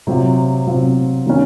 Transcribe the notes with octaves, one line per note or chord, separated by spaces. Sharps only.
C3 F#3 C4 F4
C3 F#3 C4 F4
D#3 F#3 A#3 C#4